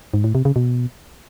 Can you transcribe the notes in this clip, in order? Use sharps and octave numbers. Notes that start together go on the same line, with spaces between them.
G#2
A2
C3
C#3
B2